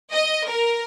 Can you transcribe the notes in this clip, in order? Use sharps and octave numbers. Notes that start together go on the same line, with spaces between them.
D#5
A#4